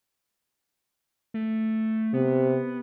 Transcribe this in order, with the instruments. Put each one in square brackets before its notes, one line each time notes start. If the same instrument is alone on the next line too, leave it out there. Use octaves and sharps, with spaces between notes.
[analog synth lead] A3
[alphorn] C3 [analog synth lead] B3